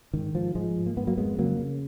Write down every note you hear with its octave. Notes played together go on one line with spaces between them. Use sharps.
G#2 D#3
G#2 F3
G#2 F3 G#3
G#2
A#3
G#2 B3
F#3 A#3
F2 G#3 B3
C#3 F#3 A#3
C#3